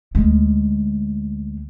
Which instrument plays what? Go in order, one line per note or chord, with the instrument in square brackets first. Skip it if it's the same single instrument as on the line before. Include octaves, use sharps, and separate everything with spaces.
[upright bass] D2 G#3